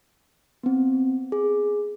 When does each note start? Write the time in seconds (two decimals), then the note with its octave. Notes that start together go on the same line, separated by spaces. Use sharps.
0.63 B3 C4
1.32 G#4